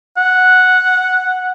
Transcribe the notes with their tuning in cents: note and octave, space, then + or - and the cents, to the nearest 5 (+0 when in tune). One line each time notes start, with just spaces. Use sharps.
F#5 -5